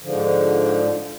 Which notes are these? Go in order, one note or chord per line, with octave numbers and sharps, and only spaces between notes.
G#2 D3 F3